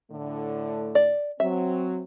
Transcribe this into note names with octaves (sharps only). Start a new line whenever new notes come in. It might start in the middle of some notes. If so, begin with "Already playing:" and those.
A2 D3 A3
D5
F#3 C4 E5